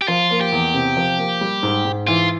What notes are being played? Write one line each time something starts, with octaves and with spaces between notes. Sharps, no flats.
G4
F3 F4
A#3
G4
E2
C3
F3
A#3
G3
G#2
G#2
E3 F4